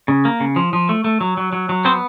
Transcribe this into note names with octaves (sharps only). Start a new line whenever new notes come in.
C#3
A#3
C#3
F3
F3
A3
A3
F#3
F#3
F#3
F#3
B3 C4 C5